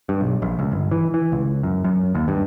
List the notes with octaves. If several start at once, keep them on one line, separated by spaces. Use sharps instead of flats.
G2
B1
A#1
C#2
G1
E3
E3
C#2
F#2
F#2
D#2
G2